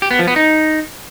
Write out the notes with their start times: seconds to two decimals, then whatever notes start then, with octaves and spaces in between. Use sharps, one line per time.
0.02 G4
0.11 B3
0.19 F3
0.28 B3
0.36 D#4